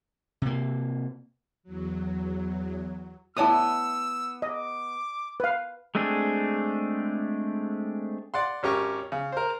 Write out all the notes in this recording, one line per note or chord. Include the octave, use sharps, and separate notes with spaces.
C3 A#3
E2 F#3
B3 E4 C#5 D5 A5 D#6 E6
D#5 D6
B4 F5
G#3 A3 C4 D4 G#4
D5 F#5 C6
G#1 C#4 G4 A#4 C#6
C#3
A#4 C5